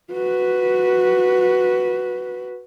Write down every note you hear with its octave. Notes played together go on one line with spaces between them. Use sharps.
F#4 B4